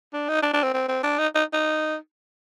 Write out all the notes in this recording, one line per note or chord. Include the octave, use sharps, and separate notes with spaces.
D4
D#4
D4
D4
C4
C4
C4
D4
D#4
D#4
D#4